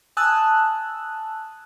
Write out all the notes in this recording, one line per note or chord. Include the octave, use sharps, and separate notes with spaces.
G#5 A5 D#6 E6 F#6